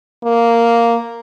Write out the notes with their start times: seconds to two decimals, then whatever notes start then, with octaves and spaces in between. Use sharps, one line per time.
0.24 A#3